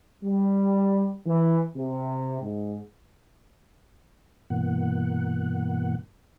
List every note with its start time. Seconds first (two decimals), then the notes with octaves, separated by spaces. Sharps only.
0.23 G3
1.27 E3
1.76 C3
2.42 G#2
4.50 G2 B2 E3 A#3 F#5